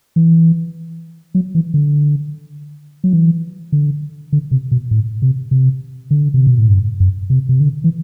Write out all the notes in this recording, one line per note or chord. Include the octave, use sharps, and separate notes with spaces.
E3
F#3
E3
D3
F#3
E3
D3
D3
C3
B2
A2
C3
C3
D3
C3
B2
A2
G2
F#2
C3
C3
D3
E3